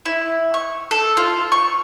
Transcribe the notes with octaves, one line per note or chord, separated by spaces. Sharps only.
E4
C#6
A4
F4
C#6